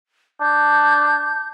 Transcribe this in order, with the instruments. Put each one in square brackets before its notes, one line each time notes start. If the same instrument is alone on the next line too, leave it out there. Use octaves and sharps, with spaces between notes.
[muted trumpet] D4 [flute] G6